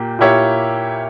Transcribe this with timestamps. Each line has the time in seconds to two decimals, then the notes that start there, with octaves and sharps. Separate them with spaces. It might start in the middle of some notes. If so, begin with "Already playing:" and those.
Already playing: A#2 A#3 G4
0.19 A#2 A#3 E4 G4 C#5